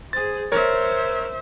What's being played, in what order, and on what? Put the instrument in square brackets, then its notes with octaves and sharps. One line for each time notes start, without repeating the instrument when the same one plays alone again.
[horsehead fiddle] G#4 C5 [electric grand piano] A6
[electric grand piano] A#4 C#5 [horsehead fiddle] C5 E5